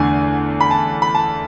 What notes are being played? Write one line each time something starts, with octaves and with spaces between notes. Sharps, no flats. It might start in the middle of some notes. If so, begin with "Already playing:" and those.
Already playing: E2 D3 A3 G#5
B5
A5
B5
A5